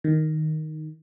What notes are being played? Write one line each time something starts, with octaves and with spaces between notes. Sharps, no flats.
D#3